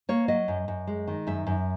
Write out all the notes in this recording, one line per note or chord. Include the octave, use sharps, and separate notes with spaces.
A#3 C#5
F#3 D#5
F#2
F#2
G#3
D#3
F#2 E5
F#2